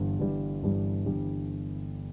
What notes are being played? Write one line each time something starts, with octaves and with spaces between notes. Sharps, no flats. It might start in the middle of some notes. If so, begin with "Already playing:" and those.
Already playing: G1 G2 E3 G3
G1 G2 E3 G3
G1 G2 E3 G3
G1 G2 E3 G3